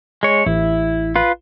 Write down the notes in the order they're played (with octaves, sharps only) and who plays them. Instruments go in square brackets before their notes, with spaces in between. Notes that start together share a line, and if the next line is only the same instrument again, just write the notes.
[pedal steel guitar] G#3 C#5
[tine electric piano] A1 [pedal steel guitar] E4
[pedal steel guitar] F4 B4